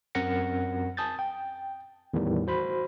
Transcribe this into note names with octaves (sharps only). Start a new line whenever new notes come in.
F#2 C4 A#4 F#5 A#6 C#7
G#5 A5 D#6 G6 A6
G5
E2 A2 D#3 E3 G3
F#4 C5 B5